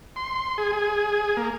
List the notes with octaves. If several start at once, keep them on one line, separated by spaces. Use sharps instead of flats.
C6
G#4
G#4
A#3